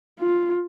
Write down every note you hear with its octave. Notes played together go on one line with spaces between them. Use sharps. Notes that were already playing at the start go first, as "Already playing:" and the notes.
F4